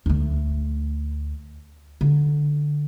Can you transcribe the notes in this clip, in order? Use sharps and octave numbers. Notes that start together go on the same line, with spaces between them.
D2 A3
D3